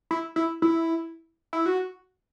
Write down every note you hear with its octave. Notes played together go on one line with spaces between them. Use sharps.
E4
E4
E4
E4
F#4